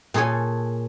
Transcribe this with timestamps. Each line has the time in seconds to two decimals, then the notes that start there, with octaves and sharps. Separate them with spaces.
0.14 A#2 G#4 A4 C#5 G#5